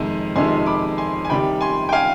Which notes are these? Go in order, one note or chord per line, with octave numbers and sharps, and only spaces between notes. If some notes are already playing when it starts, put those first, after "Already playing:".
Already playing: F2 C3 D#3 G#3
F2 C3 D#3 G#3 G#5 C6
B5 D6
G#5 C6
G#5
C3 D#3 G3 G5 B5
G#5 C6
G5
F5 G#5